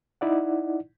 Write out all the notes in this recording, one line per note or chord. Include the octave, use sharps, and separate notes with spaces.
D#4 E4 D5 F#5